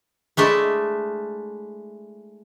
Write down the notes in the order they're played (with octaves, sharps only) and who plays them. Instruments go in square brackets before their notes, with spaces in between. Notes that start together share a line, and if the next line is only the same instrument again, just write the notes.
[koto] G#3 A3 D4 E4